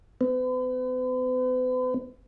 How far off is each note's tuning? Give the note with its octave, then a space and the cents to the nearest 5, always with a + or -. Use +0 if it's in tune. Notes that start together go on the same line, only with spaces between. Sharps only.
B3 +45